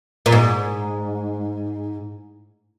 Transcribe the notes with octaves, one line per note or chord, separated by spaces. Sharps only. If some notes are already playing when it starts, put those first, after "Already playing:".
A#2
G#2